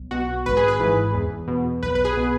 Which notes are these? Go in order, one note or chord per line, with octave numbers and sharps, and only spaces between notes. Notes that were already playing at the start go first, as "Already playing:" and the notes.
Already playing: B1
B2 F#4
G#1 B4
G#4
B4
G#2 E3
E2
B2
B1 B4
B4
G#4
B2